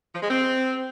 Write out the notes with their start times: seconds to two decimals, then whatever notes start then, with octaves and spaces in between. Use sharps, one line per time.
0.13 F3
0.21 G#3
0.29 C4